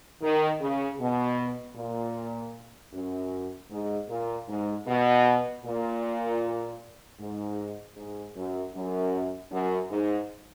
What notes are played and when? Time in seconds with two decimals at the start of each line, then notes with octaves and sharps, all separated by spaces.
0.21 D#3
0.61 C#3
0.99 B2
1.76 A#2
2.93 F#2
3.70 G#2
4.09 A#2
4.48 G#2
4.86 B2
5.64 A#2
7.19 G#2
7.96 G#2
8.35 F#2
8.74 F#2
9.51 F#2
9.90 G#2